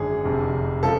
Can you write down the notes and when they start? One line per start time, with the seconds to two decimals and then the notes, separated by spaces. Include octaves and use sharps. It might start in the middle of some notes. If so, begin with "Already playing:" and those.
Already playing: G#1 F#2 D3 G#4
0.25 F1 F2 C3
0.83 C#3 F3 A4